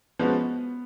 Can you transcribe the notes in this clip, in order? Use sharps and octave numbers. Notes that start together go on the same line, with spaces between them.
F3 G#3 B3 C#4 F#4